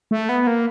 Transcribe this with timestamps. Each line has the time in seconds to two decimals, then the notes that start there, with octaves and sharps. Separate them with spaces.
0.11 A3
0.29 B3
0.47 A#3